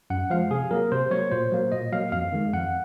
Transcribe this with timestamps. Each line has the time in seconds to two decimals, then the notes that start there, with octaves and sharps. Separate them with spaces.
0.10 F#2 F#5
0.30 F3 G#3 F5
0.51 C3 G#4
0.71 F#3 A#3 A#4
0.92 C3 C5
1.11 F#3 A#3 C#5
1.32 A#2 C5
1.52 F#3 A#3
1.72 A#2 D#5
1.92 F#3 A#3 F5
2.12 F2 F5
2.33 D#3 G#3
2.53 F2 F#5